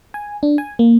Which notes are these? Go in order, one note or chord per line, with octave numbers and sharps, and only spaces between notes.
G#5
D4
G#5
A#3